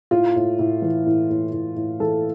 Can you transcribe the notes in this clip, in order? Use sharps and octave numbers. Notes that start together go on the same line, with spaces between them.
A2 F4
A2
A2
E3
A2
A2
A2
A2
E3 A4